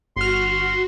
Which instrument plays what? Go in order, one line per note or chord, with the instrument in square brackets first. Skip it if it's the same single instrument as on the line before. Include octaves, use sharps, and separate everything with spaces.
[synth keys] G1 F6 [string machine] F#4 [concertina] C6